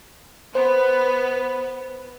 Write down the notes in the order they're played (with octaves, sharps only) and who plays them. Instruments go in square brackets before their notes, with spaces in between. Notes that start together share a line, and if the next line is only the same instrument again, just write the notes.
[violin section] B3 [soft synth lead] C5